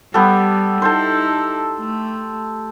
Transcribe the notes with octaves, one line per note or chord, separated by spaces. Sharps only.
G3 B3 G4 A4
D#4 E4 A4 C5
A3